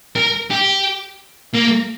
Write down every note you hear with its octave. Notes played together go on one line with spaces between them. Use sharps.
A#4
G4
A#3